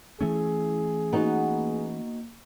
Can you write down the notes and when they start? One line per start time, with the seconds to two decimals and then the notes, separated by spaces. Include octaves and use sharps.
0.21 E3 A3 C#4 E4 G#4
1.13 A#3 B3 D#4 F#4